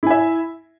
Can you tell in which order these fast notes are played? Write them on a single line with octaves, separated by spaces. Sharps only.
E4 G#5 E5